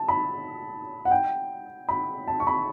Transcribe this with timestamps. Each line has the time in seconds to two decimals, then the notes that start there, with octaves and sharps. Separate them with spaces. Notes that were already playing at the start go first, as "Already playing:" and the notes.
Already playing: A5
0.09 B5
1.05 F#5
1.11 G5
1.89 B5
2.28 A5
2.40 C#6
2.47 B5